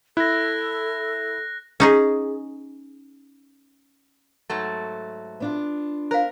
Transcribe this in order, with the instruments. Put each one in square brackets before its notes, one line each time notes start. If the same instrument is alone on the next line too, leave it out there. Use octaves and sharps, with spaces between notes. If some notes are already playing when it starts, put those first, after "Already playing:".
[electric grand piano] E4 [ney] A4 [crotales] F#6 A#6
[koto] C#4 D#4 G#4
[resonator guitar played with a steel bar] G#2 F#3 A3
[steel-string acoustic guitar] B3 D4 F4
[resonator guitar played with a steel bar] A#4 [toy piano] C5 F5